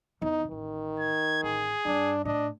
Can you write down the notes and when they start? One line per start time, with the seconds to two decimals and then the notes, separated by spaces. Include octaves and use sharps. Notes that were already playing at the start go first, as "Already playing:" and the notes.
0.21 E2 D#3 D#4
0.51 A1 D#3
1.00 G#6
1.43 A1 G#4
1.85 G2 D4
2.25 A2 D4 D#5